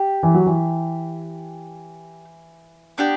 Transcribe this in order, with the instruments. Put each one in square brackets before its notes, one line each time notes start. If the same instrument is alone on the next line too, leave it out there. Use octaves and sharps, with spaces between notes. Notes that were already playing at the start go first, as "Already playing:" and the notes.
Already playing: [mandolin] G4
[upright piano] E3
F#3
E3
[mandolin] B3 D4 G4